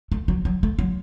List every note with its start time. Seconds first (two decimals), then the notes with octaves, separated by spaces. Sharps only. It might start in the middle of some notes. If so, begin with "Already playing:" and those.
0.12 A3
0.28 F#3
0.45 F#3
0.63 A3
0.79 F#3